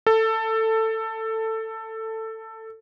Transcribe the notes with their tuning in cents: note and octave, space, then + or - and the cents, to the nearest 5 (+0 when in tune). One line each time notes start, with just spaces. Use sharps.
A4 +15